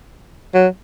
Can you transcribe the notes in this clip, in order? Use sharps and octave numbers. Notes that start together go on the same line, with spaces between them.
F#3